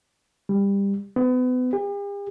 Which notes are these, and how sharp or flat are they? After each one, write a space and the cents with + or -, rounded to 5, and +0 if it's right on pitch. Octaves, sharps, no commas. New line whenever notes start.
G3 +20
B3 +35
G4 +45